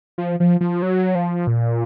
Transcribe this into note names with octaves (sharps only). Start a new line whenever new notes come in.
F3
F3
F3
F#3
F3
A#2